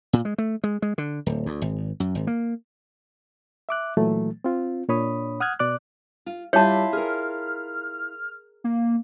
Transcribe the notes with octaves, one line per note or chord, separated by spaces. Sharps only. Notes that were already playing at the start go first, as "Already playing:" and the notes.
A#2
G#3
A3
G#3
G#3
D3
D1
D2
G#1
F#2
G#1
A#3
E5 D6 F#6
A#2 E3 F#3 A3
C4 F4
A#2 D4 C#5 B5 D#6
F#5 D#6 F6 F#6 G#6
B2 D5 D6 F#6
F4
G3 D4 E4 F4 C#5 A5
G#4 A#4 F6
A#3